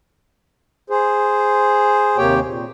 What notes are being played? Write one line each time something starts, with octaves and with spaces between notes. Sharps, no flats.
G#4 C5
D#2 C3 A#3 G4 C#5 G5
A#2